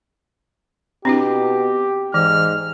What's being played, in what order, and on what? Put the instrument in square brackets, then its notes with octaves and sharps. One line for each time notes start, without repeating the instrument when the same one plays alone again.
[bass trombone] B2 [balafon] C4 D4 E4 [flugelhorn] G4
[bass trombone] G#2 [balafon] E3 [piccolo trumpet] F6